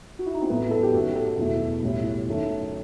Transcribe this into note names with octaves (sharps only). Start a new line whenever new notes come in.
F#4
E4
D#4
C4
A1 A2 F#3 A3 B3
A4
G4
F#2 D#3 A3 F#4
A4
E2 B2 F#3 A3
B1 A2 G3
F#2 D#3 A3